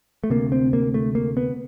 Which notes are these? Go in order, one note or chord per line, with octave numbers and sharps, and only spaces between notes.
A3
D2 C3 A#3
C4
A#3
A3
A#3
B3